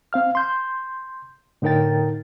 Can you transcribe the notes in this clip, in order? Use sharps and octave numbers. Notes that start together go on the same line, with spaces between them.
C4 F5 F6
C6 G6
A2 D3 D#4 A#4 G5 A6